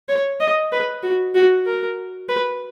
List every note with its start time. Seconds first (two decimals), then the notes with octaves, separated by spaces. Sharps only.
0.09 C#5
0.41 D#5
0.72 B4
1.03 F#4
1.35 F#4
1.66 A#4
2.29 B4